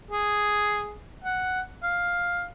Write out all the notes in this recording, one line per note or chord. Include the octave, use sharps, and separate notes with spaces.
G#4
F#5
F5